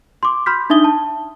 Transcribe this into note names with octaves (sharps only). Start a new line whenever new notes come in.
C6 D6
B5 C6 F6 G6 B6
D4 D#4 E5 D#6 G7
A5